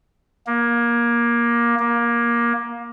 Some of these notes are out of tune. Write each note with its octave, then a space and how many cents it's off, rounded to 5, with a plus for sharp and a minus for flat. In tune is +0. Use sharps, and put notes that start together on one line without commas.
A#3 +20
A#3 +20